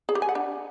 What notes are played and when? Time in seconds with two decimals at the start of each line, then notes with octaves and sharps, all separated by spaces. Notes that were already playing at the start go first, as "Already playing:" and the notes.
0.09 G#4
0.15 G4
0.22 G#5
0.29 F#5
0.35 D4